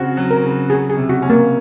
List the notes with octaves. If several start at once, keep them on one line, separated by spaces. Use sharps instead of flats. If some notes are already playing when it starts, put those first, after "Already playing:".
Already playing: C#3 C4 F#4
F#3
A#4
C#3
F#3 G#4
G#4
C3
F#4
C#4
A#3